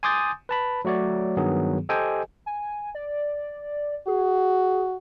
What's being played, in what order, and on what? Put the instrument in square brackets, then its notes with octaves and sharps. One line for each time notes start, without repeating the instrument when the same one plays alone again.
[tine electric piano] G#5 C6 D6 D#6 G6 A6
B4 A5 B5
F#3 A3 F#4 C#5 D5
G2 D#3 F#3 B3 G#4
G4 A4 C5 D#5 G5 G#5
[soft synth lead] G#5
D5
[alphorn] F#4 [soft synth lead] G#4